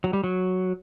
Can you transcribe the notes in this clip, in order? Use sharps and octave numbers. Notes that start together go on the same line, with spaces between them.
F#3
G3
F#3